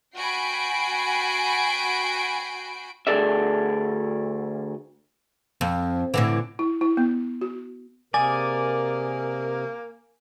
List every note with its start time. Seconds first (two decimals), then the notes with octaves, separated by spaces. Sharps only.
0.16 F#4 G5 G#5 B5 C7 D7
3.07 D2 G#3 G#4 A4 D5 E5
5.61 F2
6.14 A2 D3 E3
6.59 E4
6.81 E4
6.97 B3
7.41 F#4
8.14 C3 A#3 G#4 A#4 D5 G#5